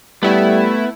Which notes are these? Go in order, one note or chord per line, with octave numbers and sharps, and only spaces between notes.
G3 A3 B3 E4